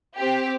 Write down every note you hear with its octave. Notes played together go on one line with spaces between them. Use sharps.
C4 G4